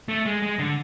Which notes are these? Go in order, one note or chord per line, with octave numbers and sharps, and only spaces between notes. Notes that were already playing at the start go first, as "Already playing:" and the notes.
A3
G#3
G#3
D3